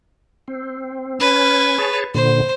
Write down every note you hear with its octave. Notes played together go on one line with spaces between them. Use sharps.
C4
C#4 B4 G#6
G#4 C#5 A5
A#2 D3 C5